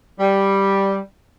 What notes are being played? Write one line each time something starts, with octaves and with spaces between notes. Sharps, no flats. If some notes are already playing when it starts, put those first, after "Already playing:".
G3